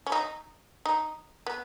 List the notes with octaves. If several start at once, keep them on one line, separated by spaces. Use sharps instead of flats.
C#4
D#4
D#4
B3